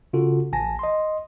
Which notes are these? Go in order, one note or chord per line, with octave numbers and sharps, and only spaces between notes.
C#3 F4 F#4 A4
A1 G#5 A5 A#6
D#5 C6